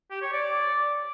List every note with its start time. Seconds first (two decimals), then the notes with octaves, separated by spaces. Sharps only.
0.11 G4
0.22 C#5
0.32 D5